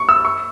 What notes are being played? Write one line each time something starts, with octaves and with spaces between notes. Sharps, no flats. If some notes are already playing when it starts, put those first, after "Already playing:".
Already playing: C#6
E6
C#6